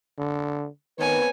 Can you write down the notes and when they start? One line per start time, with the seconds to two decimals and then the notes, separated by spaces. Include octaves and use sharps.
0.18 D3
0.98 D#3 B3 C4 B4 C#5 G#5